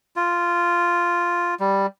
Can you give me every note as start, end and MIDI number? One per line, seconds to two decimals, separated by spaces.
0.16 1.55 65
1.60 1.86 55